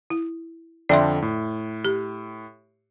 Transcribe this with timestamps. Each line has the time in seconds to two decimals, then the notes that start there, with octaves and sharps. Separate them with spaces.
0.10 E4
0.89 F2 D3 D5 E5 G5 C6
1.22 A2
1.85 G4